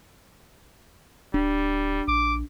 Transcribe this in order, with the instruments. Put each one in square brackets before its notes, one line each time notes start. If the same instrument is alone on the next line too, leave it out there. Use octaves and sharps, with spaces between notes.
[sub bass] D1 [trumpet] G3 [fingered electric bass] D4
[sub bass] A#1 [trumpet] D6